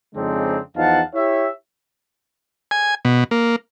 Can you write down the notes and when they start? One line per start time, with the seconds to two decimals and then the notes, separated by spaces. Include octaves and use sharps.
0.15 F2 C#3 G#3 C4 D4 D#4
0.76 E2 F3 D#4 F5 F#5 A5
1.14 E4 G4 C#5 E5
2.71 G#5
3.05 B2
3.31 A#3